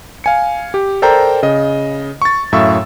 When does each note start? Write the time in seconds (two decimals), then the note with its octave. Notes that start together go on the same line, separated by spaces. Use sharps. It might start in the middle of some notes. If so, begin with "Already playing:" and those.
0.24 F5 G#5 C#7
0.74 G4
1.02 A4 A#4 C5 D5 G5 A#5
1.43 C#3 D#5
2.22 C#6 A6
2.52 F#2 A2 E5 F5 C#6 E6